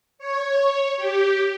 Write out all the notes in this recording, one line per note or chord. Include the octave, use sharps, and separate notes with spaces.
C#5
G4